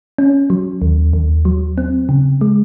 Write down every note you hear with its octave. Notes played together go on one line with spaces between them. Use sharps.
C#4
F#3
D#2
D#2
F#3
C4
C#3
G#3